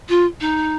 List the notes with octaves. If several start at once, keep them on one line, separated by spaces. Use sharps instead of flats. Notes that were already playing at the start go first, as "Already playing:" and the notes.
F4
D#4